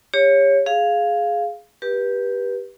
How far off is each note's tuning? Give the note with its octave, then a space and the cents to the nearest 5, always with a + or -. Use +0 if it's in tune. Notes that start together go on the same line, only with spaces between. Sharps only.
G4 +35 C#5 +0
G#4 +10 F5 +0
G4 +0 B4 -25